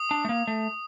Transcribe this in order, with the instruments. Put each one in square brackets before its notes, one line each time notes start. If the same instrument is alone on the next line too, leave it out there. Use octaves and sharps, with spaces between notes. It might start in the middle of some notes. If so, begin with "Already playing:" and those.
Already playing: [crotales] D#6
[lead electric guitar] D4
A3
A#3
A3